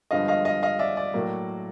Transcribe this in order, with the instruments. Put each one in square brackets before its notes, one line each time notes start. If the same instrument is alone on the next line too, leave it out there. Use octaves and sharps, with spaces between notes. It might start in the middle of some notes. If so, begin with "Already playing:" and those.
[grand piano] G2 D3 F3 G#3 B3 D#5 F5
D#5 F5
D#5 F5
D#5 F5
D5 E5
D5
A2 F#3 A#3